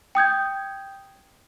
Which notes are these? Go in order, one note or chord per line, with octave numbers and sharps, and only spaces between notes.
G5 D#6 G6 G#6